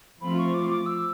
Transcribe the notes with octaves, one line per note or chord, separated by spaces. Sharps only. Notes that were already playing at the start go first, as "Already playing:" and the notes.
F3 A3 C4 F4 B5
C#6
D6
D6
E6